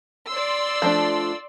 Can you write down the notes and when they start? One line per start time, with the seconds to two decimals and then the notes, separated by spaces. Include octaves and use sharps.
0.29 D5 C6 E6
0.82 F3 A3 D4